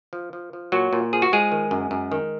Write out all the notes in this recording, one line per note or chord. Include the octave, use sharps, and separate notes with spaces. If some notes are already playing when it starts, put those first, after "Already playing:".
F3
F3
F3
A#2 F#3 F#4
A#2
F3 G#4
F#4
F3 G#3 G#4
D#3
F#2
F#2
D#3